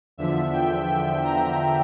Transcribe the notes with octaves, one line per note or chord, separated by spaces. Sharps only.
E2 D3 F3 E5
G5
G5
A#5